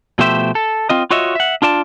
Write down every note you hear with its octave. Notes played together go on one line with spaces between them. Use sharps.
B2 F3 A3 G4 C5 E5
A4
C4 F4 D#5
F4 F#4 C#5 D#5 E5
E5 F#5
D4 F4 D5 A5